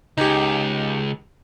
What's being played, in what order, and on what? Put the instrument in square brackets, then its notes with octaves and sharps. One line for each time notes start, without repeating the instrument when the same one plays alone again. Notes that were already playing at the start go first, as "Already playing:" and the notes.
[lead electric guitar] C#2 [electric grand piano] D#4 G4